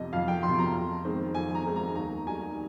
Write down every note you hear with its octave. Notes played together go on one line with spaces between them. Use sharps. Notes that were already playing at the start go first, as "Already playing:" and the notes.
Already playing: F2 C3 F3 D#5
F2 F5
G5
F3 C6
C3
A#5
F2
D#3 G#3 C4
F2 G#5
A#5
D#3 G#3 C4
A#5
D#2 A#5
D#3 G3 G#5